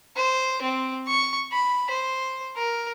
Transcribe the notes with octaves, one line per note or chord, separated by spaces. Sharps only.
C5
C4
C#6
B5
C5
A#4